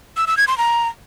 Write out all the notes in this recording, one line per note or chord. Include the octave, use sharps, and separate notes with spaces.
E6
E6
G#6
C6
A#5